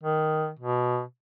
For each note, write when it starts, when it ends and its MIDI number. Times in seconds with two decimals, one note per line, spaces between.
0.03 0.50 51
0.59 1.02 47